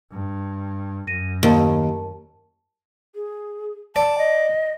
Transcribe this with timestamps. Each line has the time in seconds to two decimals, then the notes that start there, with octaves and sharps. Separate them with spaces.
0.11 G2
1.07 F#2 A#6 D#7
1.43 D#2 A#4 A5
3.15 G#4
3.96 D5 A5
4.18 D#5